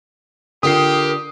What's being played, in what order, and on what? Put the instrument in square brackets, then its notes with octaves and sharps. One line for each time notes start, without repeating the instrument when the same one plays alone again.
[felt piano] D3 F4 G5 [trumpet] G4 [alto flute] A#4 [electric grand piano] D#6 C7